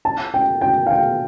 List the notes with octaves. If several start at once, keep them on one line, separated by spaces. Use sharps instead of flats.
A5
G5
G5
F5
G5